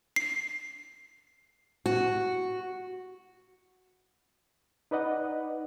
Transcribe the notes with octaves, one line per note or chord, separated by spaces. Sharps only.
C7
F#4
D#4 B4 D5 D#5 F#5